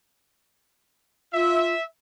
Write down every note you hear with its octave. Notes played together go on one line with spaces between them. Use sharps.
F4 E5